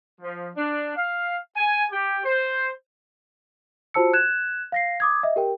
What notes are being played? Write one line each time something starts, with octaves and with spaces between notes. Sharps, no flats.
F3
D4
F5
G#5
G4
C5
F4 F#4 C5 A5 E6 C#7
F#6 G#6 E7
F5 A#6 C7
D6 D#6 G#6
D#5 E5
G4 A#4 G5